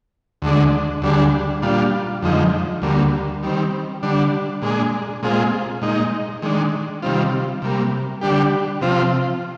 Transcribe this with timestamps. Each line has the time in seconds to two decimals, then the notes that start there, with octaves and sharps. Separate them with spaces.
0.42 D2 D3 G#3 D4
1.02 D2 D3 G3 D4 G#4
1.62 A#2 G3 D4 F4
2.22 F2 D3 F3 G#3 D#4
2.82 D2 D3 G3 A#3
3.43 D#3 G3 C4
4.03 D3 G3 D4
4.62 A#2 G#3 D4 G#4
5.23 A#2 G#3 C4 F4 G#4
5.81 A#2 G#3 D#4
6.42 D#3 G#3 D4
7.02 C3 D#3 G3 C4 F4
7.62 C3 G3 A#3
8.21 D3 G3 D4 G4
8.81 C3 F3 C4 F4